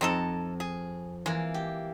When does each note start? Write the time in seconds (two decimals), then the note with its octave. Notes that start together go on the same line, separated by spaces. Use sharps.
0.01 F2 C4 D#4 A4 A#5
0.60 G#4
1.26 E3 G#3 A#3
1.54 G4